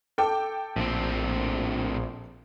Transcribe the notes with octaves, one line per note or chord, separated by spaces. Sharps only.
A4 G5 D6
A#1 A2 C4